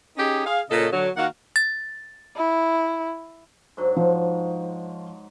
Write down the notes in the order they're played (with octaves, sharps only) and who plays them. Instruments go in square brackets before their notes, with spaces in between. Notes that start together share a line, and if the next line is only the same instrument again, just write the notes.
[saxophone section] C#4 D#4 G4 G#4 D#5
G#4 F5
A#2 C#3 A4 C#5 D#5
D3 F#3
D#3 A#3 F#4 F5 F#5
[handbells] A6
[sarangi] E4
[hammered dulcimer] G#2 D3 F#3
[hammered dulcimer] G#2 D#4 [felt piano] F3